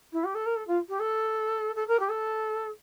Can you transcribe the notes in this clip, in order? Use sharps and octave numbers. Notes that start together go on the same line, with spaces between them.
E4
G4
A4
A#4
A4
F4
G4
A4
A4
A#4
G4
A4